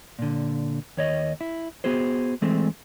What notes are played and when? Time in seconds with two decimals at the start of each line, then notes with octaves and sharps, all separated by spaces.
0.19 A#2 D3
0.97 D#2 C#5 D#5
1.41 E4
1.84 B3 F#4 G#4 C5
2.42 E3 G#3 A3 C4